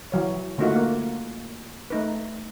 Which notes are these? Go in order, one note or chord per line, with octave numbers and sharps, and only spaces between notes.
E3 F#3 C#5
D3 A3 A#3 D#4 F4 F#4
A#3
A3 D#4 B4